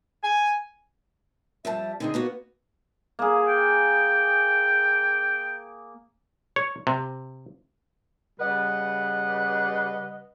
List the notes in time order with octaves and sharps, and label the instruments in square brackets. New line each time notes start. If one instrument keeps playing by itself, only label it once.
[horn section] G#5
[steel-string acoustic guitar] F2 G3 A5 [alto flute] E5
[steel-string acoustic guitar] D3 C4 G#4 [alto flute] D#4
[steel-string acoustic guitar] A#3 B3 F#4
[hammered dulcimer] A#3 G#4
[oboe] G5
[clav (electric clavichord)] C#5
C3
[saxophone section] C#3 G3 B4 D#5 F#5